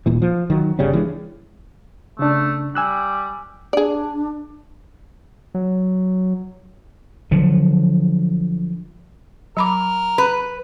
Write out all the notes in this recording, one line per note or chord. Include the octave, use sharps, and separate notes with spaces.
D#1 A#2 E3
F3
D#3 F#3
G1 C#3 G3 C#4
E3 G#3 A3 D4
C#3 A3 D4
G3 G#5 E6 F#6
D4 G#4 D5
F#3
D3 F3 F#3
F#3 A#4 B5 D6
B4